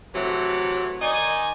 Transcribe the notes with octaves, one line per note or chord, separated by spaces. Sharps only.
C3 E3 F#3 A3
D#3 D#4 D5 D#5 G#5